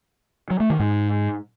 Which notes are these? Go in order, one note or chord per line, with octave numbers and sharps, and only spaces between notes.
F#3
A3
D#3
G#2